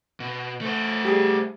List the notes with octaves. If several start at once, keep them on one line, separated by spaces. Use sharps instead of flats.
B2
A3 C5
G3 G4 G#4